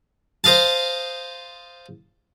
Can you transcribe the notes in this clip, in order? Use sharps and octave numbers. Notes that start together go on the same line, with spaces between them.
C5 D#5 F5 A5